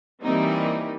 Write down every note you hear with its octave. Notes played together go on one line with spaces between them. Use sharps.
E3 G3 A#3 C4 D#4